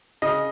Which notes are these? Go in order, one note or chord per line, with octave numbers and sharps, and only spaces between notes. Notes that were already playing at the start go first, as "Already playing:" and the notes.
C#3 D#5